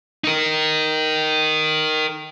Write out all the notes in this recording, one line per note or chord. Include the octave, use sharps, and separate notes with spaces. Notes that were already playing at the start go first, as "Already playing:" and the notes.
D#4 A#4